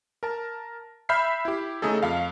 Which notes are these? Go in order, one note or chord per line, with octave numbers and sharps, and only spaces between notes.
A#4 A5
E5 B5 F6 G6 B6 C7
E4 G4
C#3 A3 D#4 G#4 A4
F2 F5